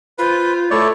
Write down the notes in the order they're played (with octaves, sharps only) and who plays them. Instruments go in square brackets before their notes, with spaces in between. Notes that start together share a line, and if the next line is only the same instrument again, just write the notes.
[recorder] F4 [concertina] B4 [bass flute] C5
[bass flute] A3 [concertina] E4 C#5 D5